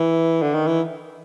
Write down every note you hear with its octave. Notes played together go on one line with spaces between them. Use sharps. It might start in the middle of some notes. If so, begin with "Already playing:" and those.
Already playing: E3
D3
D#3
E3